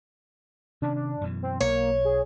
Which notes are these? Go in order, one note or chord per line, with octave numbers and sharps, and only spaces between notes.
C3 D#3 C#4 D4
D4
F#2 B2 E3
C4
B1 A#3 C#5
G#4